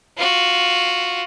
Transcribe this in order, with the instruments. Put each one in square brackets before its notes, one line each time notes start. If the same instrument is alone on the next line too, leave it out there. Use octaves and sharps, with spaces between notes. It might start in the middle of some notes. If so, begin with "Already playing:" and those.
[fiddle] F4 F#4